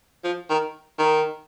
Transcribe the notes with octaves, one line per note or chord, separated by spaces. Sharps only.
F3
D#3
D#3